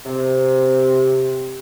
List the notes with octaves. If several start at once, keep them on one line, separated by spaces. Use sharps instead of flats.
C3